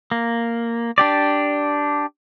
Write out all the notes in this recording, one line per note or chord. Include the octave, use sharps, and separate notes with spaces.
A#3
D4 G4 D5